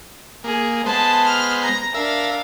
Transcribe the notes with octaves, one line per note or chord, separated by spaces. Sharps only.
A#3 G#4
G#3 B3 C5 A5
F6
A#5
D4 A#4 E5 F5